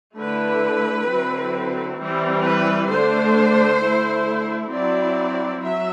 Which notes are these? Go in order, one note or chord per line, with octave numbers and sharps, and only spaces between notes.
D3 A3 E4 B4
D3 F#3 C4 E4
E3 G3 C4 E4
B4
D3 A3 D4 C5
D3 A3 E4
F#3 C4 E4 D5
F#3 E5